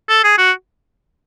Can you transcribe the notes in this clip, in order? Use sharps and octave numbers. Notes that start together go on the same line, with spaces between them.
A4
G#4
F#4